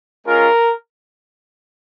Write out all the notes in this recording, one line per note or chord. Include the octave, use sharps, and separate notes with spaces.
G#3 C#4 F4 A#4